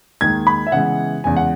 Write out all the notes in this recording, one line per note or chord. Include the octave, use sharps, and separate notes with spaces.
D#2 D#3 G#3 G#6
B5
E5
C#3 E3 G#3 B3 F#5
E2 C#3 E3 G#3 G#5
F#5